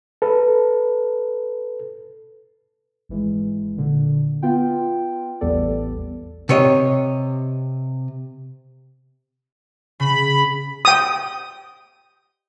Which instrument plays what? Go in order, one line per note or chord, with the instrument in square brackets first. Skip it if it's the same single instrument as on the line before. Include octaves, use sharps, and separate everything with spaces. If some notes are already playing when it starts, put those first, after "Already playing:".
[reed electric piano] A4 B4
[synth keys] G#1 E3 G#3
A#2 D3
B3 F4 G5
A1 E2 G3 B3 A4 D5
[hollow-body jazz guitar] C3 C#5 D#5
[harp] C#3 [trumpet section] B5
[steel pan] G5 D#6